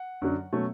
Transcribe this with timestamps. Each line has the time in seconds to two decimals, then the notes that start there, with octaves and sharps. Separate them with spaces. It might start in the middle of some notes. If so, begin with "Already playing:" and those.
Already playing: F#5
0.22 F#2 D3 F#3
0.53 B2 F#3 A3 C#4